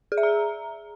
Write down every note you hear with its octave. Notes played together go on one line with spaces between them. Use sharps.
G#4
E5
A#5